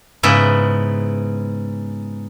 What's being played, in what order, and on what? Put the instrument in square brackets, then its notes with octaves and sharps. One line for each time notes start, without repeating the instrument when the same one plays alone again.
[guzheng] G#2 C#3 B3 E4 E5